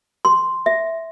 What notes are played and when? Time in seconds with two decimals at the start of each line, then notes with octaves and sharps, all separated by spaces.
0.25 C6
0.66 E5